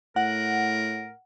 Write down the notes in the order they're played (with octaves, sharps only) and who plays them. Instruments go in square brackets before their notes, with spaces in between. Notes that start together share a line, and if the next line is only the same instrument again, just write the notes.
[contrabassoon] A2 [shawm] A#4 [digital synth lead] F#5